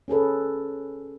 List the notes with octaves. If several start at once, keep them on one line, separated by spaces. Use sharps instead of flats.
C#4 G#4 A4 B4